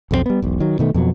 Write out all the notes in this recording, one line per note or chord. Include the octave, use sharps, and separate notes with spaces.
B1 F2 G3 C4
G3 B3
E1 B1
D#3 F#3
B2 D#3 A3
F2 B2 F3 F#3